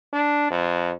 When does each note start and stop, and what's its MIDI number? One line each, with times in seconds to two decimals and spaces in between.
0.13 0.48 62
0.51 0.92 41